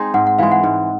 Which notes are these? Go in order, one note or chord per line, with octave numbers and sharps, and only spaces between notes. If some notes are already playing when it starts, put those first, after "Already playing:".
Already playing: G#3 C4 D#4 G#4
G#2 F#5
F#5
E3 G#3 F5
F#5
G#2